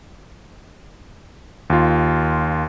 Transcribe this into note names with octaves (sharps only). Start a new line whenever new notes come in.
D#2 F4